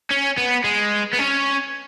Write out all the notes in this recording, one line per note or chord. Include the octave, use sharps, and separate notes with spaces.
C#4
B3
G#3
B3
C#4